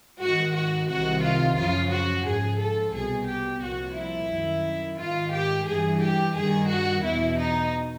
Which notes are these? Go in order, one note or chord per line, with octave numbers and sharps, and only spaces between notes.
G#2 D#3 F#4
F#4
C2 C3 D#3 F#4
F4
F#2 C#3 F3 F4
F#4
G#2 F3 G#4
A4
C2 B2 G#4
G4
C2 A#2 F3 F#4
E4
F#2 D#3
G#2 D#3 F4
G4
G2 E3 G#4
G4
G2 D#3 G#4
F#4
E2 B2 E4
D#4